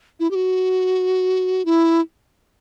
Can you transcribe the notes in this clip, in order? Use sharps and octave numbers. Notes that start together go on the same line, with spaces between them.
E4
G4
F#4
E4